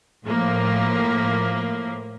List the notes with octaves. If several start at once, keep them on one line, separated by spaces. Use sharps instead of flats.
A2 F3 A#3